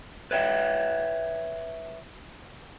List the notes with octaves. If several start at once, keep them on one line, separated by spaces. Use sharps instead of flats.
B4 C#5 E5 G5